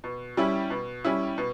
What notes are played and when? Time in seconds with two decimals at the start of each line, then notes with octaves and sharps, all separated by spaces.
0.04 B2
0.37 G3 C#4 E4
0.70 B2
1.04 G3 C#4 E4
1.38 B2